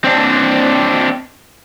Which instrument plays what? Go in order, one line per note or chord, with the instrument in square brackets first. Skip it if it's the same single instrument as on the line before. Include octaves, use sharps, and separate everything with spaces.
[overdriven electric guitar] C4 D4